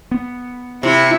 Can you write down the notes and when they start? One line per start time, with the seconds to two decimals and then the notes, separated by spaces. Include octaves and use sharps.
0.11 B3
0.83 C3 E4